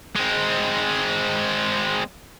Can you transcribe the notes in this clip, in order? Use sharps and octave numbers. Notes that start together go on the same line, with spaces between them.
G#3 C4